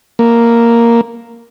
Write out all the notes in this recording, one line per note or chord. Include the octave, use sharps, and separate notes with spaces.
A#3